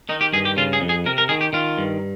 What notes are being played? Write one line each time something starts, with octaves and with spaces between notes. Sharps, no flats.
D#3 D#4
G4
G2 G#4
G4
C#3 F4
G#4
F2
G#4
C3 A#4
A#4
D#3 G#4
G4
D#3 F4
G2